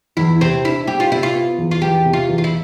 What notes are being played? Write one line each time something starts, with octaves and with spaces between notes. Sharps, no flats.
E2 E4
C3 C4
D4 E4
G3 G4
F4
C3 E4
F4
B3
E2
F4
E2 G4
C3
F4
E2
F4
E4